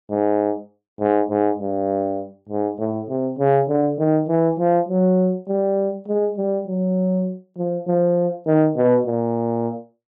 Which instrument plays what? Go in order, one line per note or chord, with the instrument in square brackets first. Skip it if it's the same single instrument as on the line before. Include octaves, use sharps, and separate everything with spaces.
[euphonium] G#2
G#2
G#2
G2
G#2
A2
C3
C#3
D3
D#3
E3
F3
F#3
G3
G#3
G3
F#3
F3
F3
D#3
B2
A#2